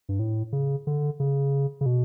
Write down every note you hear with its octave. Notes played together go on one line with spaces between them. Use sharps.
G2
A2
C#3
D3
C#3
C#3
B2